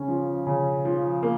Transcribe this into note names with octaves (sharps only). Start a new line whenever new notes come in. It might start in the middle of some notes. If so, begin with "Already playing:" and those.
Already playing: C#3 C#4
F3
C#3
F3
A#3